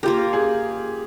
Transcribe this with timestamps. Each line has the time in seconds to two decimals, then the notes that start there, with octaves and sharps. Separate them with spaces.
0.03 A#3 F4 G4 A#4
0.33 G#4